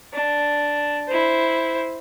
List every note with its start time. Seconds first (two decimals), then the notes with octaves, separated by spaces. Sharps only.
0.14 D4
1.08 E4 C5